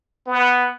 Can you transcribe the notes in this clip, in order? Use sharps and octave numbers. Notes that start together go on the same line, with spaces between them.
B3